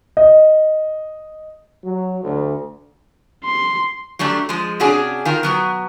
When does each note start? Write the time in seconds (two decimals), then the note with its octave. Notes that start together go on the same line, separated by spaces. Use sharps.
0.17 D#5
1.84 F#3
2.24 D2
3.45 C6
4.19 F#3 G3 A3 D4
4.49 F3 G#3
4.80 C3 C#4 D4 F#4 G#4
5.25 D#3 F4 A#4
5.43 B2 F#3 B3